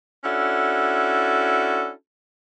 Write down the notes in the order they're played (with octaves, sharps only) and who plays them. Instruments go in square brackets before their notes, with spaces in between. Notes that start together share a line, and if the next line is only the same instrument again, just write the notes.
[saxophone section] C#4 D4 E4 F#4 A4